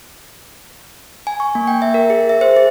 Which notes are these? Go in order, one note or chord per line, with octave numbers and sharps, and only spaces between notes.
G#5
C#6
A#3
G5
E5
A#4
G#4
E5
C5
G#4